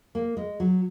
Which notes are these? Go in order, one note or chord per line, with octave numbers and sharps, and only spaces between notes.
A#3
G#3
F#3